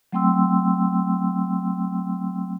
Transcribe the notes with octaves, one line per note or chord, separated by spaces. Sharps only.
F#3 A3 C4 G5 C6 E6